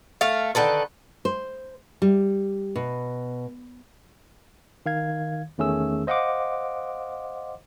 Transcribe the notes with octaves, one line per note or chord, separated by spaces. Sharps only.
A3 F5
D3 D#3 A4 B4
C5
G3
B2
D#3 F5 G#6
E2 D#3 A3 C#4 G#4 E6
C5 D#5 F5 F#5 C6 D6